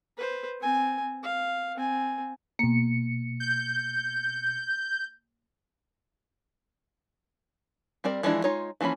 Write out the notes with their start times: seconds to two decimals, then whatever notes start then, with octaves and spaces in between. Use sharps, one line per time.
0.18 B4 C5
0.61 C4 G#5
1.23 F5
1.76 C4 G#5
2.59 B2 A#3 C#7
3.40 G6
8.04 G3 C4 A#4 D5
8.23 E3 F3 G#3 D4 E4
8.44 G#3 D#4 F4 C#5
8.81 E3 F3 A#3 C#4 B5